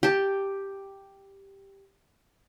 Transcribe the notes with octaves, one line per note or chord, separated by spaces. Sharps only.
G4 A5